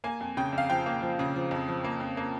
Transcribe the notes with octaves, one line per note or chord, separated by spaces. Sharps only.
A#3 G#5
F2
C#3 G5
F2 F5
F3 G5
A#3
F3
C#3
F3
F2
F3
A#3
F2
A#3